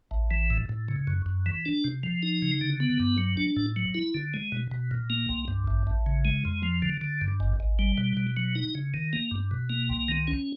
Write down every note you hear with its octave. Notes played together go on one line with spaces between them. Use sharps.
A1
E3
A2
A2
C#3
F#2
F#2
E3
D4
C3
F3
D#4
C#3
D3
B3
G2
F#3
D4
A2
F#3
E4
D3
G#3
B2
B2
A#2
A#3
C2
G2
A1
A1
C#3
G#3
F2
F3
D3
D3
G2
G#1
G#1
G3
B2
B2
F#3
D#4
C#3
D#3
A#3
G2
B2
A#3
C2
D#3
C#4